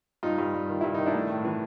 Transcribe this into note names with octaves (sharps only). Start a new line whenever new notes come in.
G2 D#4 F4
G2
G2
D#3 F4
G2 E4
D#3 D#4
D4 E4
A3
A2
E3